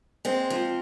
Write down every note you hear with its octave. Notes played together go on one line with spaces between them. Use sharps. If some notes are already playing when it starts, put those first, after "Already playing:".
G#3 C4
F3